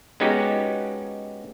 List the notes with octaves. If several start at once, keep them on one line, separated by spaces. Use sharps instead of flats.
G#3 B3 C#4 D#4 F#4 G4